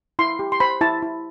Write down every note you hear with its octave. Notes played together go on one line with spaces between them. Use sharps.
E4 C6
G4
C6
C5 B5
E4 A5
E4